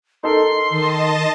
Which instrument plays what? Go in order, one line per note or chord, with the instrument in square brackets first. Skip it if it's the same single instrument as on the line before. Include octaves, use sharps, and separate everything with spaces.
[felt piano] D#4 A4 A#4 [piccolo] C6
[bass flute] D#3 [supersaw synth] D#5 A5